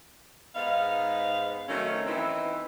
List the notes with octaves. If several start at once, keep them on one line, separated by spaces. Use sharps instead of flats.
G#2 B3 D#4 F5
D#3 F#3 A3 C4 C#4
E3 B3 C4 D#4 E4